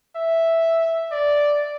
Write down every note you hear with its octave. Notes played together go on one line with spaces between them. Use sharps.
E5
D5